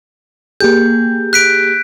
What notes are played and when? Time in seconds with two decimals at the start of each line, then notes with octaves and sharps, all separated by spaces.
0.60 A#3 G4 G#4 G6
1.33 F#6 B6 D7